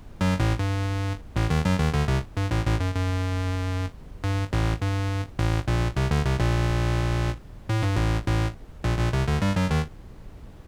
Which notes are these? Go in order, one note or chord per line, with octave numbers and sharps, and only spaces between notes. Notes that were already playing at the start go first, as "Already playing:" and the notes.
F#2 F#3
A1 A2
G2
A1 A2
D#2 D#3
F#2 F#3
D#2 D#3
D2 D3
C2 C3
G2
A1 A2
A1 A2
F#2
F#2
G2
A1 A2
G2
A1 A2
A#1 A#2
C2 C3
D2 D3
C2 C3
A#1 A#2
A2
G2
A1 A2
A1 A2
A#1 A#2
A#1 A#2
C2 C3
D2 D3
G2 G3
F#2 F#3
D#2 D#3